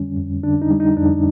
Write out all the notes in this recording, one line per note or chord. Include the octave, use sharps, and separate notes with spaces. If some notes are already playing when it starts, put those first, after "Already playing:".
Already playing: F2 D3 G3 C#4
F2
D3 D4
D#4
G3
D#4
F2 D4